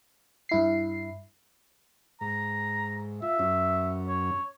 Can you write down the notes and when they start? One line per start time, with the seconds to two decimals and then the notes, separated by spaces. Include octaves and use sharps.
0.49 G2 E4 C7
2.21 G#2 A#5
3.22 F4 E5
3.39 F#2 C#4
4.08 C#5